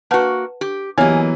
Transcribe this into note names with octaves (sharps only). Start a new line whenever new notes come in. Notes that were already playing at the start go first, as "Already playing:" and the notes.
A#3 F#4 B4 F#5 A5
G4
E3 F#3 A#3 B3 G4 C#5 D#5 G#5